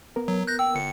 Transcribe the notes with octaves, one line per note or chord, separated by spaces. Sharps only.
B3 A#4
F#3
F#6 G6 A#6
G5 E6
G1 C#7